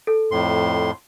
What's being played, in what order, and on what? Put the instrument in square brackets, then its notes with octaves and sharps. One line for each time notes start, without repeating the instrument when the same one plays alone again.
[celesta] A4
[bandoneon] F2 A2 C6